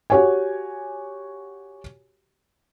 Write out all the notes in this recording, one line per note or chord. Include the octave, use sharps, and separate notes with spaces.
F#4 G4 C#5 F#5 G#5